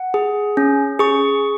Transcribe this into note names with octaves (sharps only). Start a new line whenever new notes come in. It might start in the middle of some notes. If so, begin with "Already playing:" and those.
Already playing: F#5
G#4
C#4
G#4 C#6